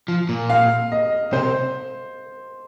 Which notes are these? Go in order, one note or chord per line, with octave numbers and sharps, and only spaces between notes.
F3
A#2
F5
D#5
C3 C5